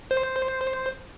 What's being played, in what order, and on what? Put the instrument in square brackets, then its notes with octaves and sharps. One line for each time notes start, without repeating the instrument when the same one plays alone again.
[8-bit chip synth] C5